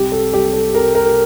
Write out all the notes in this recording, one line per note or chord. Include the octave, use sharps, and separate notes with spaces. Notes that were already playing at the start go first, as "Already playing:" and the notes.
Already playing: C2 G4
A4
G3 G4
A4
C3 A#4
A#4